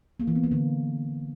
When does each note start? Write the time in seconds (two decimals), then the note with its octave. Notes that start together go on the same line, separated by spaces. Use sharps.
0.20 A#3
0.27 E3
0.35 B3
0.43 A#3
0.51 D3